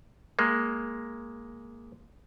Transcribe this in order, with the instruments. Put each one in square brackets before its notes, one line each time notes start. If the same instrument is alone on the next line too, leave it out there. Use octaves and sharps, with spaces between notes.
[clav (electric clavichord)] G#3 A#3